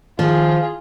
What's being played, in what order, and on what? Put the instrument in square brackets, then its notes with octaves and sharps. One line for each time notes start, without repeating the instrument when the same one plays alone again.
[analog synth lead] D#3 [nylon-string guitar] F3 [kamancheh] F4 G#4